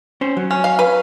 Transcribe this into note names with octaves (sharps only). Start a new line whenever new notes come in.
C#4 C5
F#3
C#4
F5
B4